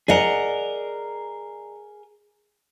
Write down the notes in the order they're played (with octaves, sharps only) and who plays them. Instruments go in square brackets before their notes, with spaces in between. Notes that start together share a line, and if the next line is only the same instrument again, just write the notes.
[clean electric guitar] G#4 A#4 [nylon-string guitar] D5 D#5 F#5